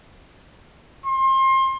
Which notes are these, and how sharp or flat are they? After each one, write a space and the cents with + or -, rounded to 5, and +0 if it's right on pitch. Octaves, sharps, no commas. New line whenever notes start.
C6 +30